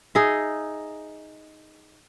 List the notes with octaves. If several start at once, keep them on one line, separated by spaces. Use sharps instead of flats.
D#4 G#4 D#5 E5